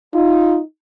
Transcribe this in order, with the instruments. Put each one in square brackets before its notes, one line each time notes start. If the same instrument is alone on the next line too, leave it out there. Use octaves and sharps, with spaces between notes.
[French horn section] D#4 [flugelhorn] F4